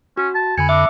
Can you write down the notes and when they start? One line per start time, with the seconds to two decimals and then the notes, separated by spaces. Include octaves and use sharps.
0.17 C#4 F#4
0.35 A5
0.58 F2 D3 G#5 B5 C#7
0.69 D4 E5 D6 E6